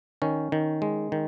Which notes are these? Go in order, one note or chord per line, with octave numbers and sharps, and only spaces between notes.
D#3 C#4
D#3
G#3
D#3